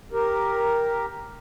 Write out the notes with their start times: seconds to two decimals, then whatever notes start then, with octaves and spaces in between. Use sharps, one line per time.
0.12 G4 A#4